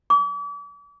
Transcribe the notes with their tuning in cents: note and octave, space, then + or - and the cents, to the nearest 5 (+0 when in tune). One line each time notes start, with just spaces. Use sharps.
D6 -40